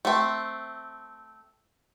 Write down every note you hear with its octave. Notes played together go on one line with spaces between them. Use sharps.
A3 C4